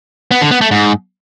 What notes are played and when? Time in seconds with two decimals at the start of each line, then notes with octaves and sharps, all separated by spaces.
0.31 B3
0.41 D3
0.51 B3
0.61 A3
0.71 G#2